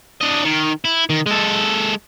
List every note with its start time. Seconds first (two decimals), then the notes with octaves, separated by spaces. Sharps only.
0.21 D4 D#5
0.45 D#3
0.85 E4
1.10 D#3
1.26 G#3 A4